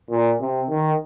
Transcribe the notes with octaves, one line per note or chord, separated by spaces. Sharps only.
A#2
C3
D#3